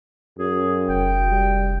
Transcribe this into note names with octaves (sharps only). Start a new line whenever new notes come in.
F#2 G#4
F1 G5
G3